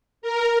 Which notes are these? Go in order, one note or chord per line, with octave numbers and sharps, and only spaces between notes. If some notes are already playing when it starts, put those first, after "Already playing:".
A#4